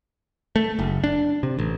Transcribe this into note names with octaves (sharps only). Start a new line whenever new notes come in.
A3
F#1
D4
C3
A1